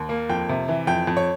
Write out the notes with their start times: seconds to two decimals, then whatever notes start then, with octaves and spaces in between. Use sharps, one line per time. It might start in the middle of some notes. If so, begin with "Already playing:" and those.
Already playing: D#2
0.09 A#3
0.29 F2 G5
0.49 C3
0.68 E3
0.87 F2 G5
1.07 F2
1.17 C#5